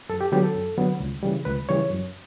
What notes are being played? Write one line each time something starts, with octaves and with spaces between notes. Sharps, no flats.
F#2 A4
G4
D3 F#3 B3 G4
A4
F#2
D3 F#3 B3
C#2
C#3 E3 G3
C#2 B4
C#3 E3 G3 C#5
F#2